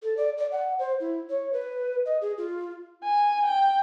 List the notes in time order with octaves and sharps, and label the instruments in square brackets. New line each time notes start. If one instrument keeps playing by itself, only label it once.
[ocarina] A4
D5
D5
F#5
C5
E4
C#5
B4
D#5
G#4
F4
[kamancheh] G#5
G5